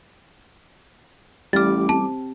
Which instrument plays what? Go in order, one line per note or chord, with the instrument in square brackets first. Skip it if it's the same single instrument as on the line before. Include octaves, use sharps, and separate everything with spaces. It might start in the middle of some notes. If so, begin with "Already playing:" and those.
[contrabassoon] A1 [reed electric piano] G3 D6 [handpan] G4 [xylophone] F6 A6
[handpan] C4 [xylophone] A5